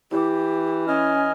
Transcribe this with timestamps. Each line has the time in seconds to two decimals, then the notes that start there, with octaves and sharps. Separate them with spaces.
0.11 E3 E4 G4 D6
0.88 C#4 D#5 G#5 F6